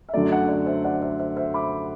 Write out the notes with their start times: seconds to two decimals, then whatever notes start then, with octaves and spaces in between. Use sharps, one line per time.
0.09 E5
0.14 F#2 D3 F#3 A3 D5
0.32 D5 F#5
0.49 D5
0.66 C5 E5
0.84 D5 F#5
1.02 C5 E5
1.19 C5 E5
1.37 C5 E5
1.54 B5 D6